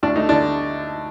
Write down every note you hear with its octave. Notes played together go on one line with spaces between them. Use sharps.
D2 D4
A3 D#4
D3 D4